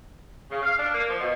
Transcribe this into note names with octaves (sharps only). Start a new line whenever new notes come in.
C#3
F5
D4
A#3
F3
B2